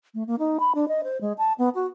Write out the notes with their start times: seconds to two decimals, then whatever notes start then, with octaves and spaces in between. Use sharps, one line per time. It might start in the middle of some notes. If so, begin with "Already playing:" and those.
0.14 A3
0.27 A#3
0.39 D#4
0.60 B5
0.75 D4
0.88 D#5
1.04 C5
1.21 G#3
1.38 A5
1.58 B3
1.75 F#4